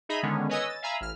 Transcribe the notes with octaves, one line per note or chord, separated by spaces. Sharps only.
D#4 G#4 D#5 E5 A#5 B5
D3 D#3 G#3 B3 C#4
B4 C#5 D#5 G#5 D#6 E6
A6
E5 F5 G#5 A#5 B5 E6
A1 F6